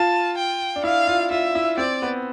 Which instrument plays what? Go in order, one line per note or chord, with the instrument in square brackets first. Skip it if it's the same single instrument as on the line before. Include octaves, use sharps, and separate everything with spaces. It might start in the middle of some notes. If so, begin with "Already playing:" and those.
Already playing: [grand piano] F4 [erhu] A5
[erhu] G5
[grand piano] D4
[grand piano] E4 [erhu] F5
[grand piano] F4
[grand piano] F4 [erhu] E5
[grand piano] E4
[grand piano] C4 [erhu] D5
[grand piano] B3